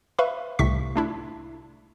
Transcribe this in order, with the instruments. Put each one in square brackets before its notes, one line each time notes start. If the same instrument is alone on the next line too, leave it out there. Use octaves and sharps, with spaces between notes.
[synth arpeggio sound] B4 E5 F5 B5 C#6
C2 A2 C3 C#6 B6
A3 D4 E4